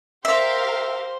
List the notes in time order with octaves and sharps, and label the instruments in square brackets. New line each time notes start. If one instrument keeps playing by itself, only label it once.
[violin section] G4 A#4 F5 [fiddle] C5 [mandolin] E5